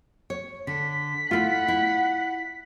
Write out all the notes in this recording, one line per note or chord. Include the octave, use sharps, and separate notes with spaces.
C#5
D3 B6
A3 E4 F4 F#5
E4